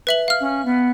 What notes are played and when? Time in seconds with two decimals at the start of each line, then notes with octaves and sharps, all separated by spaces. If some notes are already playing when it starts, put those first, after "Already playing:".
0.07 B4 E5 F#7
0.28 F5 F6
0.40 C#4
0.65 B3